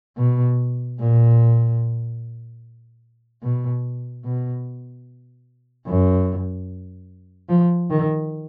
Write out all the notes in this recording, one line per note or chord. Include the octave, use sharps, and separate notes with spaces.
B2
A#2
B2
B2
F#2
F3
D#3